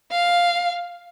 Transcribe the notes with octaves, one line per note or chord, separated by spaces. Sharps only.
F5